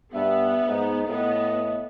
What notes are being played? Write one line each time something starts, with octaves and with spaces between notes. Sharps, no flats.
G2 B3 E5
G#2 D#4
A2 B3 D#5